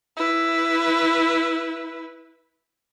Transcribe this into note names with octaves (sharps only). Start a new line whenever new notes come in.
E4 B4